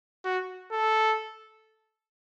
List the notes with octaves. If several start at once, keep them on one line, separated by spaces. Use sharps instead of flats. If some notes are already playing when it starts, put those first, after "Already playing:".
F#4
A4